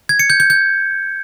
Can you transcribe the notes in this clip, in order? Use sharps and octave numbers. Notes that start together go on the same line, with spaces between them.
G#6
C#7
G6
G6
G6